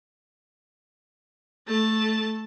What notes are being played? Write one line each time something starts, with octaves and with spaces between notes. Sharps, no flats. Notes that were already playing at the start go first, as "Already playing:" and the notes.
A3 A5